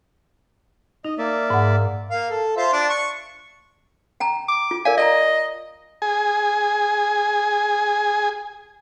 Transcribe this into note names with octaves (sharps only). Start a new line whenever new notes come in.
D#4 D#5
A#3 D5 E5
G#2 F#5
A#3 F5
A4
F4 C5 E5
D4 D5
C#6
G5 A5 A#5
D6
F4
A#4 D5 F5 G#5
D5 D#5 A5 A#5
G#4 G#5